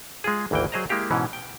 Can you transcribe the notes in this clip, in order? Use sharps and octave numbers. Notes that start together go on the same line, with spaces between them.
G#3 F4 G#4
G#1 D2 E3 A#3 G5
F#3 G#4 C5 D#5 A#5
G#3 A#3 E4 G4 F5
G#2 B2 E3 C#4
G5